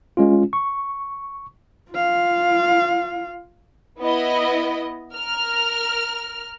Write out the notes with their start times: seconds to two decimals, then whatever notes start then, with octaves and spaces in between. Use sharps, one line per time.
0.17 G#3 C#4 F4
0.53 C#6
1.91 F4 F5
4.00 B3 E4 D#5
5.14 A#4 F6